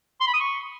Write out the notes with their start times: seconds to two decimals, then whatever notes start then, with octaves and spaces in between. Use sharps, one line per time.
0.20 C6
0.27 B5
0.34 D#6
0.40 C#6